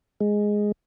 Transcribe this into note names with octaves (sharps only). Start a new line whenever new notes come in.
G#3